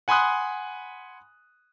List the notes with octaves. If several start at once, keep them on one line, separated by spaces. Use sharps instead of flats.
F#5 G#5 B5 C6 D#6 F#6